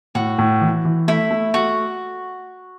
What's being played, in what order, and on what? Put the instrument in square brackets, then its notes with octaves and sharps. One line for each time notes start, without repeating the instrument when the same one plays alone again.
[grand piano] A2 [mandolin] F#4
[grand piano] A2
E3
E3
[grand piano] A3 [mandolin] E4
[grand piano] A3
[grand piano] A3 [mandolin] F#4